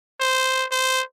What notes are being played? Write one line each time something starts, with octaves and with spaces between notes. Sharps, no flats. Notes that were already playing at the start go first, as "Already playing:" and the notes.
C5
C5